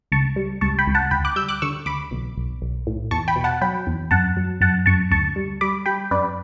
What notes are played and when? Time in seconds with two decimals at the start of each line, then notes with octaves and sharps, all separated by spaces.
0.12 C#2 A5 C#6
0.36 G3
0.61 C#2 A5 C#6
0.79 G5 B5
0.87 C#2
0.95 F#5 A5
1.11 D2 G5 B5
1.25 D6 F#6
1.36 G3 E6 G6
1.49 D6 F#6
1.62 D3 C#6 E6
1.86 D2 B5 D6
2.11 B1
2.37 B1
2.62 B1
2.87 A2
3.11 E2 A5 C#6
3.28 G5 B5
3.36 B2
3.44 F#5 A5
3.61 F#3 G5 B5
3.87 E2
4.11 F#2 F#5 A5
4.37 F#3
4.61 F#2 F#5 A5
4.86 F#2 A5 C#6
5.11 D2 A5 C#6
5.36 G3
5.61 G3 B5 D6
5.86 G3 G5 B5
6.11 F#2 B4 D5